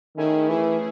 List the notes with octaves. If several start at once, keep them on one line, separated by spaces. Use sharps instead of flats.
D#3 A3 C#4 E4 G#4
E3 A3 C#4 E4 G#4